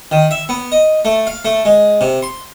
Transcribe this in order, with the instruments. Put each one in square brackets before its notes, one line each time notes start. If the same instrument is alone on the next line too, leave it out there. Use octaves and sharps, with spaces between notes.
[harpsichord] D#3
E5
B3
D#5
A3
F5
A3
G#3
C3
C6